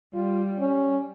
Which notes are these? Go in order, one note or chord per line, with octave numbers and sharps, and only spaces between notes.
G3 F4
C#4